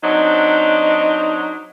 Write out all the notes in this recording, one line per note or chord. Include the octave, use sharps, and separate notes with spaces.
F#3 C4 D4 D#4